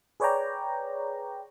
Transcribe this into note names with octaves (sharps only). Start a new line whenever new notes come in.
G#4 B4 C#5 D5 G5 A#5